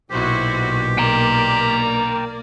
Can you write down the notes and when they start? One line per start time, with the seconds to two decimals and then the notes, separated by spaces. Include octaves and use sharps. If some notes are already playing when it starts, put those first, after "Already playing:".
0.11 B1 A#2 E4 F#4 G4 C5
0.98 A#3 A#4 D5 G5 A#5